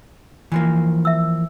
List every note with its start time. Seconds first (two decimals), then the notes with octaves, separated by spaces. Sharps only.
0.52 E3 F3 A#3
1.05 E5 E6